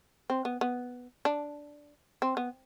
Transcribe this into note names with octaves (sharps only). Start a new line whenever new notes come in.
C4
B3
B3
D4
C4
B3